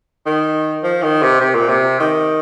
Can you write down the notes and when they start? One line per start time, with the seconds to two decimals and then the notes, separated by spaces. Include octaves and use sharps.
0.26 D#3
0.83 F3
1.03 D#3
1.22 C3
1.41 C3
1.55 A#2
1.69 C3
2.00 D#3